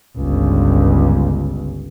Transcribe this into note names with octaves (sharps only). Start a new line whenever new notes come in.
G1 C#2